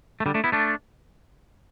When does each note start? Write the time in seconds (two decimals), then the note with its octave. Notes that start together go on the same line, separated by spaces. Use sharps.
0.20 A3
0.26 D3 G3
0.34 A3 D4
0.44 B3 E4
0.52 A3 D4